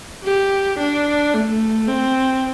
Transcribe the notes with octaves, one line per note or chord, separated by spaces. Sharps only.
G4
D4
A3
C4